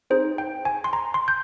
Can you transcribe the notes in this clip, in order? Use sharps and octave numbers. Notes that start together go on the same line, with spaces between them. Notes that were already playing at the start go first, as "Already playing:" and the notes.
C4 D#4 G#4 C5
G5
G#5
C6
A#5
C6
G6